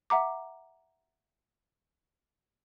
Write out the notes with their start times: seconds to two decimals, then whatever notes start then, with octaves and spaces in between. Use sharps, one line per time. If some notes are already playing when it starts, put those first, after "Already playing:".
0.10 E5 F#5 A#5 D6